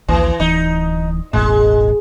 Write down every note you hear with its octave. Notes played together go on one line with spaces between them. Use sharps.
A#1 D#2 E3
D1 E3 D#4
E1 A1 A2 G#3